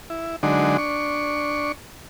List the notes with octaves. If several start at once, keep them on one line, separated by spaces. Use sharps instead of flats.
E4
D3 F#3 G#3 D4 D#4
D4 C#6